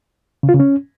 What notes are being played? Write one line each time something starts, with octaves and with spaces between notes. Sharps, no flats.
C#3
F4
C#3
C#4